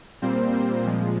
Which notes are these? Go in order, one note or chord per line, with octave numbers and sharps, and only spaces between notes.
A#2 G3 A#3 C4 C5
A#2 F3 G#3